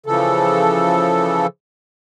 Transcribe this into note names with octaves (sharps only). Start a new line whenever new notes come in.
C#3 E3 F3 A4